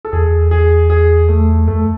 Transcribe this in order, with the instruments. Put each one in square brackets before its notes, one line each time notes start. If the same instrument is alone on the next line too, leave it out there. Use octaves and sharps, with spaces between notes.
[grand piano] A4
[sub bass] E2 [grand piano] G#4
[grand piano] G#4
G#4
A3
[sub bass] F#2 [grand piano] A3